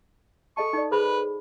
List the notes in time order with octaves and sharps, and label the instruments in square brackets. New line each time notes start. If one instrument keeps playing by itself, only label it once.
[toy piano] A4 D#5 A5 [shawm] C#6
[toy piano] D#4 A4 D5
[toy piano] G#4 C5 B5 [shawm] B4